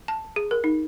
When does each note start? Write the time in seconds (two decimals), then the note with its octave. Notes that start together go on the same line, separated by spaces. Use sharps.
0.08 A5
0.36 G#4
0.51 A#4
0.64 D#4